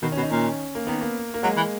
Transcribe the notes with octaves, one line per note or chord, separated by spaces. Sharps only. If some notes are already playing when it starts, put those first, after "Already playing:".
B2 D#3
C#4
B2
D#4
A#2 C#4
A#3
D#3 B3
A#3
A#3
F#3 G#3
E3